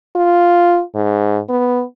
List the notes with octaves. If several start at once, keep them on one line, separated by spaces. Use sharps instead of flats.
F4
G#2
B3